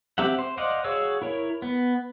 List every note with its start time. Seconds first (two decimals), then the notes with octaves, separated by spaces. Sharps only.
0.18 C4 G4 E5 F#5
0.39 C5
0.58 C5 D5 D#5 F5 F#5
0.84 F#4 G#4 C#5 F5 E6
1.22 E4 A#4 C#5
1.62 B3